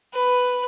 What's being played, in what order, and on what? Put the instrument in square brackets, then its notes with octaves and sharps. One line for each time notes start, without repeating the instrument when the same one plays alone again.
[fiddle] B4